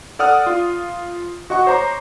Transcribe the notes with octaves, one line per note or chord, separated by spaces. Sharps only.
A4 D5 F#5 D#6 F6
F4
F#4 D#5 F#5 C#6
C5 C#5 A#5 C6 D6